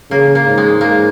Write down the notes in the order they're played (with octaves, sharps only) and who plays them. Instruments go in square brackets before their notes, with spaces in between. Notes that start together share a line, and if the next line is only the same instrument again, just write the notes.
[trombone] C#3 [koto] A#3
[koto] A#3
[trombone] G#2
[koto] G#3
A#3